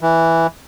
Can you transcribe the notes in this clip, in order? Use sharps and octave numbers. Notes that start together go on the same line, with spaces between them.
E3